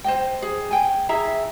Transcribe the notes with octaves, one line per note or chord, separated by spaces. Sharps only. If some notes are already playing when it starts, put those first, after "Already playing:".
C5 D#5 G5
G#4
G5 G#5
E4 G#4 E5 A#5